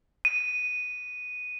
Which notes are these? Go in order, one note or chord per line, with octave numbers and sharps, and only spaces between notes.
D#7